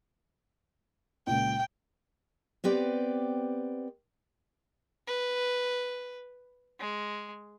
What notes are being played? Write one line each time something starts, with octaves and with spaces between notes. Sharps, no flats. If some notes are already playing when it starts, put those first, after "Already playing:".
C#2 A#2 G5
B3 C4 G4 B4 D5
B4
G#3